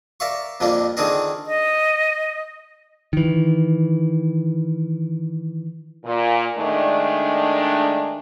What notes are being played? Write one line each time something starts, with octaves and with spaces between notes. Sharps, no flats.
A#4 D5 E5 F5 C#6
F2 C3 F3 G3 A#3 D4
D3 D#3 C4 D4 G#4 A#4
D#5
D#3 E3
A#2
D#3 G#3 A3 D4